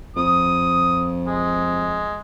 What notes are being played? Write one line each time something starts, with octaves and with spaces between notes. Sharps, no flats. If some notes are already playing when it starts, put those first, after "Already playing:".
F2 D#6
G#3